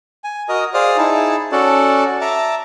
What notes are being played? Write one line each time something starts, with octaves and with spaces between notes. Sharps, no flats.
G#5
F#4 A#4 D#5 A#5 D#6
G#4 C5 D5 F5 D#6 F6
D#4 E4 G#4 A5
C#4 F#4 A4 D5 F#5 A5
E5 A5 A#5 D6